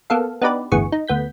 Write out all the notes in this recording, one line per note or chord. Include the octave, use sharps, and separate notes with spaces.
A#3 B3 A4 F5
B3 D4 D#4 G4 B4 D5
G1 E2 A2 B3 G#4 C#6
D#4
D2 B3 G6 B6